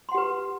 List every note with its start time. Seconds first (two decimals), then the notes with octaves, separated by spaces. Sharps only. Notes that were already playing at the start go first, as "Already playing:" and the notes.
0.09 C6
0.12 F#5
0.15 G4
0.17 B4